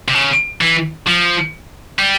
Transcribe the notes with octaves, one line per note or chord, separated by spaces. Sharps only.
C3
C#3
E3
F3
G3